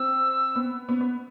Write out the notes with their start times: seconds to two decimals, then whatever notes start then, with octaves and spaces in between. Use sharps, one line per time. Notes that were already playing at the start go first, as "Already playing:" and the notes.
Already playing: C4 E6
0.55 B3
0.89 B3
1.01 B3